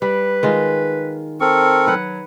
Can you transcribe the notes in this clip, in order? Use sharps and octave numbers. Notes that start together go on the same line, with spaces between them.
G3 B4
D#3 G#3 F4
C4 A4 A#4 C#6
F#3 B4 F#5